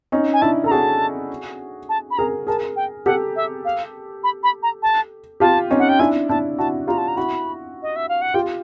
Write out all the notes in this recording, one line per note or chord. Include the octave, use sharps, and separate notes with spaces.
C#4 D#4
G#5
D4 E4 A5
A4 A#5
F#4 G#4 A5
A5
B5
G#4 A#4 A#5
G#4 A#4 A5
G5
G4 A4 F#5
E5
F5
B5
B5
A#5
A5
F4 G4 A5
C#4 D#4
F#5
G5
D4 E4 G#5
D4 E4 A5
E4 F#4 A5
F4 G4 A#5
A5
A#5
E4 F#4 B5
D#5
E5
F5
F#5
F4 G4 G5